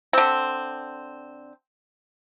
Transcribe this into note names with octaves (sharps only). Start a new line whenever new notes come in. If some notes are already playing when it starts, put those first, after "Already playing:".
D3 C4